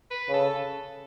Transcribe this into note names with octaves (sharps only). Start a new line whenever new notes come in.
B4
C#3
A4